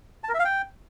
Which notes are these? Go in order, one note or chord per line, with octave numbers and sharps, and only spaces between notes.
A5
A#4
E5
F5
G5